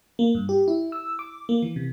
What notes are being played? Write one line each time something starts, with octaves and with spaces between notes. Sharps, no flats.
A#3
G2
G4
E4
E6
D6
A#3
E3
C3